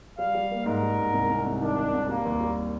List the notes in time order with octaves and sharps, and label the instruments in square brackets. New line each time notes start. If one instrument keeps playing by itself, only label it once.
[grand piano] G3 [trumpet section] F5
[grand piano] G3
A#3
[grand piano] G#2 [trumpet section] A#4
[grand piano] G3
G#2
C2
C2
C2
[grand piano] D#3 [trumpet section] D4
[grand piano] D#3
C2
[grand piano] G3 [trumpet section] A#3
[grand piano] D#2
G3